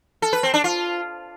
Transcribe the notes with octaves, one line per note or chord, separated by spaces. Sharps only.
A4
B4
C4
D4
F4